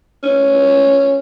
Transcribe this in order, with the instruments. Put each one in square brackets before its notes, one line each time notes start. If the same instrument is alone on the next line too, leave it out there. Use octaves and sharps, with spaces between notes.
[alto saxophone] C#4